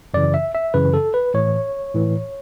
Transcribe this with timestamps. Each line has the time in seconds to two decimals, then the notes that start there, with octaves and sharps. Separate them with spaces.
0.14 F#2 C#3 E3 D5
0.34 E5
0.55 E5
0.74 F#2 C#3 E3 B4
0.94 A4
1.14 B4
1.34 A2 E3 C#5
1.95 A2 E3